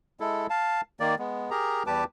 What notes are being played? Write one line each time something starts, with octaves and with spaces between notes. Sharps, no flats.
G#3 E4 A4
F5 A5
D#3 A#3 D5
G#3 B3
G4 G#4 A#4 A#5
E2 G3 G4 B4 A5 D6